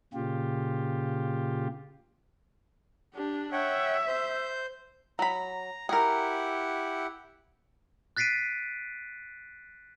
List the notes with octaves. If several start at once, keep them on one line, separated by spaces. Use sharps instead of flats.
A#2 C#3 F4 G4
D4 G4
C#5 E5 F#5 G5
C5 G6
F#3 A#5 B5
E4 G4 G#4 A#4 F#5
F#6 A6 B6 C7 D7 D#7